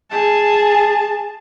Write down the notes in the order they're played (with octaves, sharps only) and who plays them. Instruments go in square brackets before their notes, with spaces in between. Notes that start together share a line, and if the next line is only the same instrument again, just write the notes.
[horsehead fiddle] G#4 A5